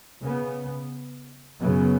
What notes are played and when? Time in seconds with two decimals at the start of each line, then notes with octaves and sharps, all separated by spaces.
0.22 C#3 B3
1.60 F#2 C#3 B3